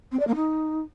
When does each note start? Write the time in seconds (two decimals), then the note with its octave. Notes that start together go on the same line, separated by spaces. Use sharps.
0.12 C4
0.20 D5
0.27 A#3
0.35 D#4